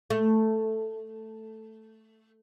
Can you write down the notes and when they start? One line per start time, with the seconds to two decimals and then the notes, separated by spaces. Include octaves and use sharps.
0.10 A3